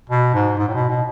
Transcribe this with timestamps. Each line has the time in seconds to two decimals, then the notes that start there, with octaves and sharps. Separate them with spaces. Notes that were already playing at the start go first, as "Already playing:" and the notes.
0.10 B2
0.34 G#2
0.58 G#2
0.68 A2
0.74 B2
0.90 B2